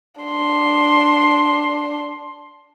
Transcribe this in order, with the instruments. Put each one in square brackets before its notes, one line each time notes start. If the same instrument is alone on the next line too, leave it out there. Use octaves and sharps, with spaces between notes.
[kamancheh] D4 C6